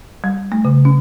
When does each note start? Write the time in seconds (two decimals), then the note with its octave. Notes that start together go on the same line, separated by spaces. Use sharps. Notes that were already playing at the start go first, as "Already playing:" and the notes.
0.24 G3
0.52 A3
0.65 C#3
0.85 C#4